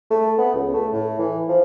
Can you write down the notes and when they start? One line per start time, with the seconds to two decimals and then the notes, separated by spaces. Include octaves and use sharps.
0.11 A3
0.39 B3
0.55 C#2
0.74 A3
0.93 A2
1.19 E3
1.49 F3